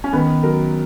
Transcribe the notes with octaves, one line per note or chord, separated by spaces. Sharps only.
C#4
D#3 B3
F#3 A#4